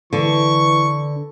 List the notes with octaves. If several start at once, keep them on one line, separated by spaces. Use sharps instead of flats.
D3 E3 C#6